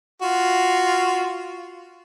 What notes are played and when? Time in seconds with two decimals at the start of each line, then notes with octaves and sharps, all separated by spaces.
0.22 F4 F#4